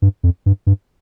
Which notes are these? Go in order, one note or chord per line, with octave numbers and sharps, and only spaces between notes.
G2
F2
G2
G2